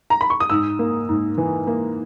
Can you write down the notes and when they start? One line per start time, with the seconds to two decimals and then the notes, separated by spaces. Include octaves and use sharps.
0.10 A#5
0.21 B5
0.30 C#6
0.40 D#6
0.50 G#2 E6
0.79 A#3
1.09 G#2
1.38 E3
1.67 A#3